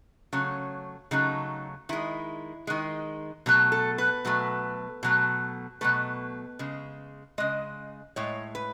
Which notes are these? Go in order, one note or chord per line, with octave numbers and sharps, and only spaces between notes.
C#3 F#3 A3 C#4
C#3 F#3 A3 D#4
D#3 G#3 E4
D#3 G#3
B2 F#3 A3
A4
B4
B2 F#3 A3
B2 F#3 A3
B2 F#3 A3 B4
C#3 G#3
C#3 G#3 D#5
A2 G#3 C#5
B4